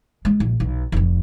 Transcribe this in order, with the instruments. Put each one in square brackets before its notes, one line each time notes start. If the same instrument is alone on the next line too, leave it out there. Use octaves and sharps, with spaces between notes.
[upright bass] G#3 D4
A#1
B1
F1 F2